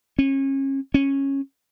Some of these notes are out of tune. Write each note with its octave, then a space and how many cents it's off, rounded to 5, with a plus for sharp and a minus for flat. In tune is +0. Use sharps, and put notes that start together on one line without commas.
C#4 -30
C#4 -15